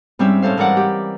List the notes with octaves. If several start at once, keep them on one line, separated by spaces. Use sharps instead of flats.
G#2 G3 C4 C#4 E5
A2 C#4 A4 C5 F5
G#2 E3 A#4 D5 F#5
G4